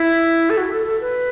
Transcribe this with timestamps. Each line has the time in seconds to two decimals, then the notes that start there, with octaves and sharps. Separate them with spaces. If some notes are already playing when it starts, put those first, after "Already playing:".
Already playing: E4
0.50 A4
0.57 F#4
0.72 A4
0.86 A4
1.01 B4